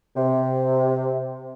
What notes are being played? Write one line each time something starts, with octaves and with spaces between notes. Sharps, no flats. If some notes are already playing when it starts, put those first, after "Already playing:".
C3